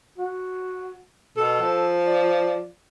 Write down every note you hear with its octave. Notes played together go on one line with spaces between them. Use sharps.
F#4
B2 A4
F3
D5